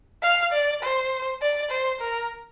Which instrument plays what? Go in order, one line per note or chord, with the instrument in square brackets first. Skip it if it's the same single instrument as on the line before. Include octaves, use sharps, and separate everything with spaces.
[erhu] F5
D5
C5
D5
C5
A#4